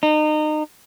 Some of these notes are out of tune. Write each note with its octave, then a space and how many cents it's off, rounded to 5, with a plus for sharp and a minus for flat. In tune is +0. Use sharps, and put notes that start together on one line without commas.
D#4 -30